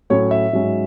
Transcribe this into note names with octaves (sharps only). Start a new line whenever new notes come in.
A2 F#3 C#4 C#5
E5
G#2 F#3 C#4